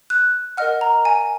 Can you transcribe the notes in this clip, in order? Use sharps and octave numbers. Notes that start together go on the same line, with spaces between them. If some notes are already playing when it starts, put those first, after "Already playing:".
F#6
A#4 D#5 F#5 F6
A#5
G#5